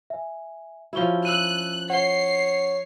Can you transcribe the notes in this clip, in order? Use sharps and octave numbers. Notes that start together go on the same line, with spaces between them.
E5 G#5
F3 C#4 E4 F#4 G7
E6 F#6 D#7
C#5 F#5 C7 G7